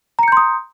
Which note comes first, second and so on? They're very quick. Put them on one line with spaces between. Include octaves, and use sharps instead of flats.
A#5 C#7 G6 C6 D#6